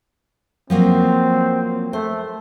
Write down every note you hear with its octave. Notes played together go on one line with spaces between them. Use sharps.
F3 F#3 A#3 C4
A3 C5